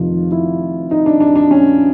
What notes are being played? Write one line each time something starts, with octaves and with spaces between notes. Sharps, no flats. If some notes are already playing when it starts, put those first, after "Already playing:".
Already playing: F1 F2 C3 D#3 F4
E4
D#4
D4
D4
D4
C#4